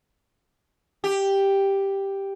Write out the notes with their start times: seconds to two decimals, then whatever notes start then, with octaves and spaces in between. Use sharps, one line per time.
1.04 G4